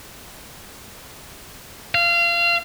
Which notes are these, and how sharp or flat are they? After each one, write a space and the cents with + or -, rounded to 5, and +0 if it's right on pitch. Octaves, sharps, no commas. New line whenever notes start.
F5 -25